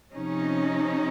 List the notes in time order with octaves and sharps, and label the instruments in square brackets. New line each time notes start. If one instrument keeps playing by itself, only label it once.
[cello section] C3 F3 C#4 D#4